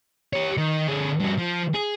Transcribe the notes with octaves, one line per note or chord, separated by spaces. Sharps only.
G4 C#5
D#3
D3 G#4
G2 F#4
F3
G#4